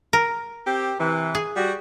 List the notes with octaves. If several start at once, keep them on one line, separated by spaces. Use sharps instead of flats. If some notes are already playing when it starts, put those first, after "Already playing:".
A#4
C4 G4
C3 E3
G#4
G3 F#4